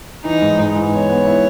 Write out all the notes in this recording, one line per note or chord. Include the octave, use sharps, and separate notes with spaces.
E3 D#4
G#2
G#2
E3
B3 C#5
B3
E4